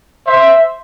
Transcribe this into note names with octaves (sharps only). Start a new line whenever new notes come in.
C5 E5